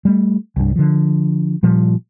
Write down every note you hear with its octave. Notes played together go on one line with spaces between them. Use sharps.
G3 A3
C2 G2
D3 F3
A#2 F3 G3